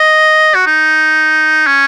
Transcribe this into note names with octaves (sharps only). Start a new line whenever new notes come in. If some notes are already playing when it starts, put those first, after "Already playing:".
Already playing: D#5
F#4
D#4
C#4